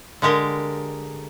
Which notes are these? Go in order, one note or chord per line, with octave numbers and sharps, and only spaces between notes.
D3 G#3 G4 A#4